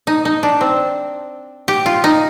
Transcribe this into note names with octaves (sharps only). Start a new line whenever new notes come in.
D#4
D#4
D4
C4
G4
F4
D#4